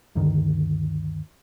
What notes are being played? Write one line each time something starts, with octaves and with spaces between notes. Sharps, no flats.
D2 G2 D3 D#3